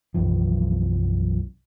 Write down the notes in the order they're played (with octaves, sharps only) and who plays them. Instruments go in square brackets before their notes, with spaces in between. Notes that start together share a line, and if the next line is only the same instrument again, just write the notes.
[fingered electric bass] B1 F#2 E3 F3